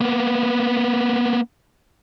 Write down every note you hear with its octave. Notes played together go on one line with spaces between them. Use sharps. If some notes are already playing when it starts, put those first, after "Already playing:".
A#3 B3